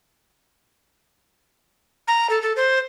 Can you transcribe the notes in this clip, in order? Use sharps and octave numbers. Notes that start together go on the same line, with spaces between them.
A#5
A4
A4
C5